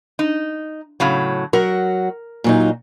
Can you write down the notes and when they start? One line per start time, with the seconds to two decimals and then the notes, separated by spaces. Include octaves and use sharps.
0.19 D#4
1.00 A2 C#3 F#3
1.53 F#3 F#4 A#4
2.44 A#2 F#3 D#4